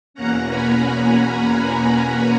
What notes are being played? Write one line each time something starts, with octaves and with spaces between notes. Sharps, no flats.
E2 B2 A#3 C#4 F#5 A#5
G#5 B5
F#5 A#5